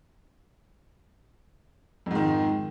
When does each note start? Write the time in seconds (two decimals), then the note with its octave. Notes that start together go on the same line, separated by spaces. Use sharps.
2.06 F2
2.11 G#2
2.15 D#3